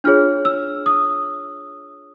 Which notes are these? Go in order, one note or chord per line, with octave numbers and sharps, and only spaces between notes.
D4 F4 G#4 C#5 F6
E6
D#6